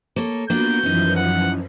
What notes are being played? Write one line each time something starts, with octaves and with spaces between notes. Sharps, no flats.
A#3 A4 C#5
A#3 B3 D4 F4 F#4 G6
F#2 E3 F3 C#4 D#4
F#5